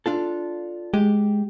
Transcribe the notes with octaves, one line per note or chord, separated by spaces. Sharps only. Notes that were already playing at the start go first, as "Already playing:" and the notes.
D4 F4 A4
G#3 G4